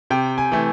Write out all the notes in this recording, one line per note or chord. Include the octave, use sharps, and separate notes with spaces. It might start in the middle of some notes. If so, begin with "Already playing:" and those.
C3 G5
G#5
E3 A3